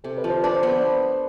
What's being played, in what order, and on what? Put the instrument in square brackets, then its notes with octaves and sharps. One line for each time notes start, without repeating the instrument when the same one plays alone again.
[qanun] C3 [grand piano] A4
[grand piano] B4
[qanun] F3
[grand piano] C5
[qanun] D4 [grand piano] B4
[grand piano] C5
[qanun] B3 [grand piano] B4